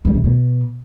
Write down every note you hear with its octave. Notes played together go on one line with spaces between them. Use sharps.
G2
C3
B2